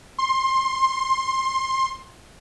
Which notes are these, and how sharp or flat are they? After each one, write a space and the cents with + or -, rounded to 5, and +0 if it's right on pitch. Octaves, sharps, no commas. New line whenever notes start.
C6 +20